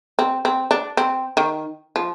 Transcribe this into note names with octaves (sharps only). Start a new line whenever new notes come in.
C4
C4
D4
C4
D#3
F3